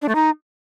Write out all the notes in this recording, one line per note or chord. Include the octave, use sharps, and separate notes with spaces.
D4
A3
D#4